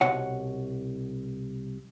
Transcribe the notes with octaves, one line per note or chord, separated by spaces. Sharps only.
C2 B2 C#5 F#5